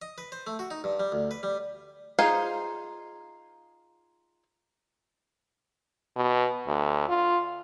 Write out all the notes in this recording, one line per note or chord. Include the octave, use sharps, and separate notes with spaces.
D#5
B4
C5
A3
F#4
D#4
G2
G3
D2
B4
G3
D#4 F4 G#4 C5 F5
B2
D2
F4